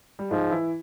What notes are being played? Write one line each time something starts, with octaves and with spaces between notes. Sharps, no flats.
G3
G#2 F3 G#3
E3 E4